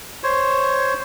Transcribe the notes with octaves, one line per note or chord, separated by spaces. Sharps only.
C5 C#5